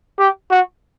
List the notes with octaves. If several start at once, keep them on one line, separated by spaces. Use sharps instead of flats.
G4
F#4